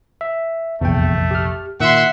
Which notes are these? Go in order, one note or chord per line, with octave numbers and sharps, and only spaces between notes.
E5
F1 A#1 E2 A3 G5
G4 F6
A#2 D#3 E5 F#5 C6